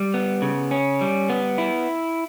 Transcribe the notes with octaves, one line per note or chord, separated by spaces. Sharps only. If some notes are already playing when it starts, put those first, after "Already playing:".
Already playing: G3
B3
C#3
C#4
G3
B3
E4